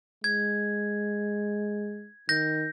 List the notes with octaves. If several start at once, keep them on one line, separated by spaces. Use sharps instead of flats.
G#3 G#6
D#3 G6 A#6